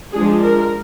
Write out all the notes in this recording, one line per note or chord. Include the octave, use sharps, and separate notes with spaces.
F3 G#3 D4 G#4
A#4